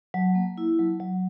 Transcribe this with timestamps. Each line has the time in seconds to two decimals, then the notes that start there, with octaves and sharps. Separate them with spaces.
0.14 F#3
0.35 A#3
0.58 E4
0.79 F#3
1.00 F#3